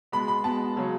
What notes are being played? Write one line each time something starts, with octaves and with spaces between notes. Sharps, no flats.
B2 G#3 B3 B5
B5
B2 G#3 B3 A5
C#3 F#3 C#4